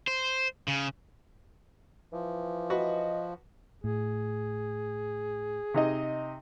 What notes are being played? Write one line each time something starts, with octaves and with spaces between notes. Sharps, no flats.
C5
C#3
E3 F3
F#4 B4 D#5
A2 G#4
C3 D#4 D#5